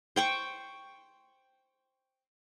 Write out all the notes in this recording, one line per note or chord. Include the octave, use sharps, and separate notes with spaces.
C5 G5 C#6